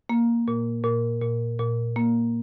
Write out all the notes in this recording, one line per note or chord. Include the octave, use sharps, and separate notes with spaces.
A#3
A#2
A#2
A#2
A#2
A#3